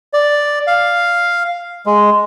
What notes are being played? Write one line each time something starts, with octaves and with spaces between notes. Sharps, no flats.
D5
F5
G#3